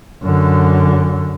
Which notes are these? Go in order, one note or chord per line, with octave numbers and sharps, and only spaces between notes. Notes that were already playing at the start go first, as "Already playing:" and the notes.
F#2 D3